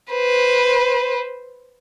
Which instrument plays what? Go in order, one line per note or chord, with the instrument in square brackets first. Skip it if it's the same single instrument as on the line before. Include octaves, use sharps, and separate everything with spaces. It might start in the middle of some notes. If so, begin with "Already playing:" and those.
[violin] B4 C5